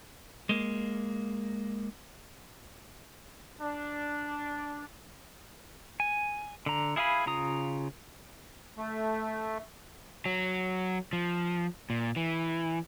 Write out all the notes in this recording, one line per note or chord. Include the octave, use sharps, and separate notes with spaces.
G#3 A#3
D4
G#5
D3 A#5
E4 G#4 F5 G#5 B5
C#3 F4 A#5 D#6
A3
F#3
F3
A#2
E3